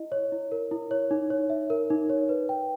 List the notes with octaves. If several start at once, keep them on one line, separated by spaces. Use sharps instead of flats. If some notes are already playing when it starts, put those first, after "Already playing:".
Already playing: E4 D#5
C#5
E4
A#4
E4
C#5
D#4
C#5
E5
A#4
D#4
C#5
B4
G5